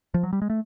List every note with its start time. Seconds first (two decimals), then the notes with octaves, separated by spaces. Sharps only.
0.14 F3
0.23 F#3
0.33 G3
0.42 G#3
0.50 A3